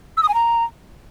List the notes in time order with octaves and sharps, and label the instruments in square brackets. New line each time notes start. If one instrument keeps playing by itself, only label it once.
[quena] E6
D#6
G#5
A#5